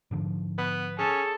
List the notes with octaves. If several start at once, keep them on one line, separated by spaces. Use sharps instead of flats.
G#2 D3 F3
B3 B4
C#4 G#4 A4